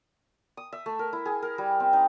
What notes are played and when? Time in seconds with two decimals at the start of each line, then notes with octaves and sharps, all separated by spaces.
0.57 D#6
0.72 E5
0.86 A3
0.99 A#4
1.13 E4
1.25 G#4
1.42 A#4
1.58 G3
1.80 C4
1.93 D#4